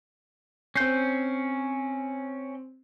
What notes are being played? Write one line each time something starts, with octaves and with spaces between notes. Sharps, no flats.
C4 C#4 G6 C7